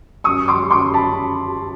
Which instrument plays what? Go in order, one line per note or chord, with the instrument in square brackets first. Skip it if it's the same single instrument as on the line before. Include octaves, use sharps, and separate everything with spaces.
[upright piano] F#2 C#6 D#6
C6 D6
F#2 C6 D6
A5 B5